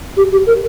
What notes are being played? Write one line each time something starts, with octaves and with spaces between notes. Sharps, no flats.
G4
G4
A#4